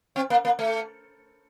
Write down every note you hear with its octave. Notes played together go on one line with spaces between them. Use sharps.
C4
A#3
A#3
A3